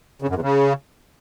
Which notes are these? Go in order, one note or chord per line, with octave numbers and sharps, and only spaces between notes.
C#3
F#2
E2
C#3